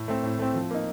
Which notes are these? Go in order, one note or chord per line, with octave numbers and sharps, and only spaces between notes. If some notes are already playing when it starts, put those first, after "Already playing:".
Already playing: A2
A3 C4
A2
A3 C4
F3
A#3 D#4